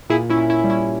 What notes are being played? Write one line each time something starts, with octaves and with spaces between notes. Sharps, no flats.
A#2 E4 G#4
C#4 E4
A#2
C#4 E4
G3
C#4 E4